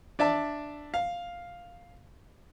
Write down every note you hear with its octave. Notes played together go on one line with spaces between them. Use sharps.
D4 D5 E5 A5
F5